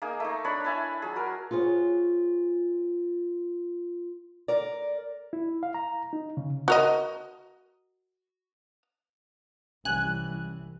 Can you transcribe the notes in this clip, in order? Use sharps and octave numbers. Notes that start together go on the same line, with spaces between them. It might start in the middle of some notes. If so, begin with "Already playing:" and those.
A#3 D#4 G#4
A3 D#4
D4 C#5 B5
E4 G#5 A5 B5
F#3 G#4
F#4 A#4
F4 F#4 G#4 C5 C#5
A#4 D5
E4
F5
A#5
D#4
C#3
F#4 A#4 D#5
C2 E3 G3 C#4 G#5 F#6